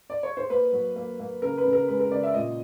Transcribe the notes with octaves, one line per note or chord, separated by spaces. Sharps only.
D5
C#5
C5
A#3 B4
F#3
A#3
A#3
C#3 A#4
B4
C#3
A#4
G#3 B4
A#4
C#3 D5
E5
A#2 D#5